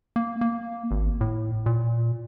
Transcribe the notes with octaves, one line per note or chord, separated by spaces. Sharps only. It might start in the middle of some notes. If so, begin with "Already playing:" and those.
A#3
A#3
G#1
A2
A#2